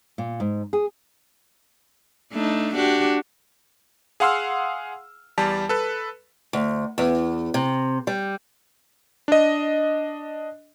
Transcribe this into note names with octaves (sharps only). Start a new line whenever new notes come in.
A#2
G#2
G#4
A3 D4 D#4
D4 F#4 G4
G#4 F5 F#5 C6 E6 F6
E2 G3 A5
A4 B4
D2
E2
C3
G3
D4 D#5